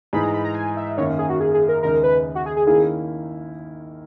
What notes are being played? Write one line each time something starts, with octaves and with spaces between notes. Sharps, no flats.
G#2 E3 G#3 D#4 G#4 B5
A#5
B5
A#5
G#5
E5
F#2 D#3 A#3 C#4 C#5
G#4
F#4
G#4
G#4
A#4
D#2 C#3 G#3 D#4 A#4
B4
F#4
G#4
G#4
D#3 A#3 C#4 E4 G#4